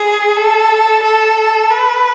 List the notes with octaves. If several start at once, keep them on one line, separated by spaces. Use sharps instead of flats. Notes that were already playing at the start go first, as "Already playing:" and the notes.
Already playing: G#4
A4
A4
B4